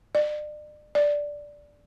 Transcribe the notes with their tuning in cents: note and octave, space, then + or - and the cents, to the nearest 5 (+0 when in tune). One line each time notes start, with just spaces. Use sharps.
D5 +35
D5 -5